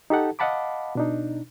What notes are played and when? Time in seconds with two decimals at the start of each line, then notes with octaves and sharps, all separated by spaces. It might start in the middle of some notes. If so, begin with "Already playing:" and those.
0.10 D#4 G4 A4 F#5 A5
0.39 D#5 F5 F#5 A5 B5 D6
0.95 B2 D4 D#4